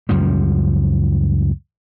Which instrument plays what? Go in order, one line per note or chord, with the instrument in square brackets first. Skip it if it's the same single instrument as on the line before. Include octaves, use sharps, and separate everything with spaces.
[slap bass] C#2 F#2 F3 G3